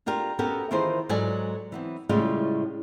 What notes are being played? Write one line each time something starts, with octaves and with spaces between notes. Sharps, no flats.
D4 F4 G4 A#4
B3 C#4 F#4 G4 A4 A#4
D#3 E3 F4 G#4 A#4 C5
G#2 F#3 A4 D5 G#5
E3 B3 C4
A2 C#3 G3 G#3 F4